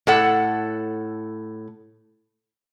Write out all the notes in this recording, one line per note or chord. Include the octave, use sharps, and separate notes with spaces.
A2 A4 F#5